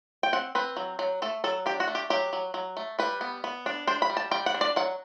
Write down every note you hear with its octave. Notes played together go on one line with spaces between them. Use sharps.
G5
C4 F#5
C4 B4
F#3
F#3
A3 A4
F#3 A4
D4 G4
F#4
A3
G4
F#3 G4
F#3
F#3
A3
G3 B4
B3
B3
D4
D4 C5
B5
G3
A5
G3 G5
F#5
D4
D5
F#3 F#5